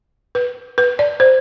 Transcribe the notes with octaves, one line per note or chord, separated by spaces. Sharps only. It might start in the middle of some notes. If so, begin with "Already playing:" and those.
B4
B4
D5
C5